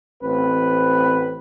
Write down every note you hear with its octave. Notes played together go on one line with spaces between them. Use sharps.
A1 C4 B4